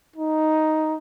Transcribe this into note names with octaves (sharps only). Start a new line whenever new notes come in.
D#4